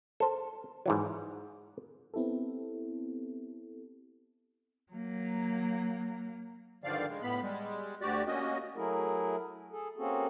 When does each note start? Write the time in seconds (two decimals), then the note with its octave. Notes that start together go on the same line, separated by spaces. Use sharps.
0.20 A4 C5
0.86 G#2 E3 F#3
2.14 B3 C4 E4 G4 A4
4.92 F#3 A#3
6.84 G2 D3 D#3 F3 D5 F5
7.09 C#3 G#3
7.22 A2 B3 B5
7.42 G3 G#3
8.01 D2 F#4 G4 D5
8.27 A#3 C#4 F#4 D#5
8.74 F#3 A3 E4 G#4 A#4
9.71 G#4 A4
9.97 A#3 C4 C#4 F#4 G#4 A4